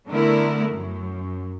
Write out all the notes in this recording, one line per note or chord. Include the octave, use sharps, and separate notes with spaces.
D3 A3 B3 E4 A#4
F#2